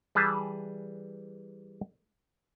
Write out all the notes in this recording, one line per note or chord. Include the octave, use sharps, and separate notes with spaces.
E3 G3 G#4 B4 A5